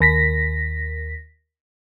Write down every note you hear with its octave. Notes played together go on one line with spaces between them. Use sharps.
D#2 A#6 B6